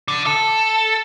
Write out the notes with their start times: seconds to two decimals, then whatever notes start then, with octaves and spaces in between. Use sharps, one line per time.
0.08 D3
0.26 A4